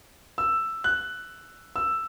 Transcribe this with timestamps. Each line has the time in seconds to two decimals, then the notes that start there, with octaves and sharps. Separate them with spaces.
0.38 E6
0.84 F#6
1.76 E6